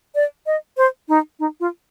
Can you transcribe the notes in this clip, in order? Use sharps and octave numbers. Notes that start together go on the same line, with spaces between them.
D5
D#5
C5
D#4
D#4
F4